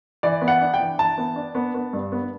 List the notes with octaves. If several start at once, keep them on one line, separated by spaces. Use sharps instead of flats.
E3 D5
B3
F#5
D4
G5
E3
E3 A5
B3
D4
B3
B3
G2
B3